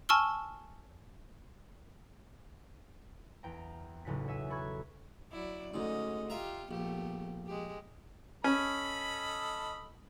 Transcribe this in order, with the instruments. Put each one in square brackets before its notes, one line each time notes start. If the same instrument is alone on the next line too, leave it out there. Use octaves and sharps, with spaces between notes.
[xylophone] G#5 A5 C#6 E6 F6 G7
[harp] E2 G5 A#5
B1 A2 C#3 F#4 B6
C#5 E5 G#5
A4 B5 C#6 F#6 G#6
[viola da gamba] F#3 E4 D5
[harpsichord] D2 G#2 [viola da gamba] C#4 D#5
[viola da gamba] F4 G4 [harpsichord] E5 A#5
[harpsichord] A#1 [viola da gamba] A3 B3 G4
[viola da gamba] G#3 G4
[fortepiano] C#4 [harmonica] A4 D#5 B5